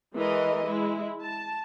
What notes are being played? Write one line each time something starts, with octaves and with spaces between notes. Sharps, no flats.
E3 G#3 A#4 D#5
G#3 E4
A5